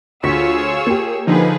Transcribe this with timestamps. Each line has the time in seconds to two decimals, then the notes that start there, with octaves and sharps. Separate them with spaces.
0.23 D2 F4 G#4 C#5 C#6 E6 B6
0.87 A#3 G4
1.27 D3 F3 D#4 G#4 B4